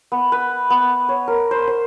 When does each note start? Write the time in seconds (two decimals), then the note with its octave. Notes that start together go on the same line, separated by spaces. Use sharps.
0.12 B3
0.32 B4
0.70 B3
1.09 C#5
1.28 A#4
1.51 C5
1.67 C5